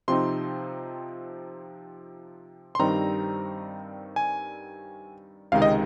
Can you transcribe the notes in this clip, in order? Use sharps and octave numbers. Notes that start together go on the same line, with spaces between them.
C3 F3 C4 D#4 C6
C6
G2 D#3 G3 C4 D#4 A#5
G#5
C#2 C3 D#3 G#3 D#4 F5
D#5